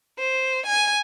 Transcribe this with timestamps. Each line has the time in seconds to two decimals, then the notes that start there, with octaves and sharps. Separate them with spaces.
0.19 C5
0.67 G#5